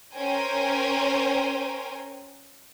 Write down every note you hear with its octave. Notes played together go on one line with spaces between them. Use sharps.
C#4 A#4 C5 G5 G#5